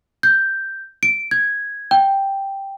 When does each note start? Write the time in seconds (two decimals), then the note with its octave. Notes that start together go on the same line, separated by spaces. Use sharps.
0.23 G6
1.03 D7
1.31 G#6
1.91 G5